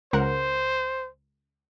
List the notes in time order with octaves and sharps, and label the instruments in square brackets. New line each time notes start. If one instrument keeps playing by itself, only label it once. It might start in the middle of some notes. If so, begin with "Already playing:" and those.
[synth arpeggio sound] C#2 A#4 F#5 [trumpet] C5